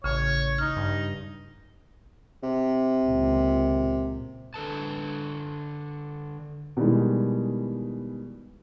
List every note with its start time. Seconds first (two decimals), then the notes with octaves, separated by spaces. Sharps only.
0.04 A1 C#3 C#5
0.58 D#4 F6
0.76 G2
2.43 C3
3.05 C#2 A#2
4.54 D3 A4 B4 A5
6.77 B2 D#3 E3 G3 G#3